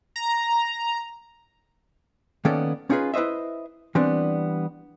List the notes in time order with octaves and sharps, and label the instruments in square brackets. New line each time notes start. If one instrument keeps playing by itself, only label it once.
[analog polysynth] A#5
[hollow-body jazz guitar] D#3 A#3 B3 C#4 A4 D5
C#4 D#4 F4 G#4 B4
E4 B4 C5 D#5 E5
E3 G3 B3 C4 D4